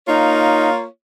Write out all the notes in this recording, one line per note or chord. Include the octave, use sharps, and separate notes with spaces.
A#3 D#4 F4 C#5